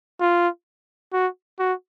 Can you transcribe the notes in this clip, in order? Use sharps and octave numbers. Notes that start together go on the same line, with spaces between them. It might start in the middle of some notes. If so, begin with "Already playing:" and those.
F4
F#4
F#4